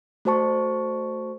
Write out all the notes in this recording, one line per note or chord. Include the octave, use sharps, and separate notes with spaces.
A3 F#4 C5 A5 C#6